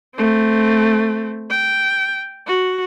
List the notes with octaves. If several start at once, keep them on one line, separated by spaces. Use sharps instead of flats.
A3 C4
G5
F#4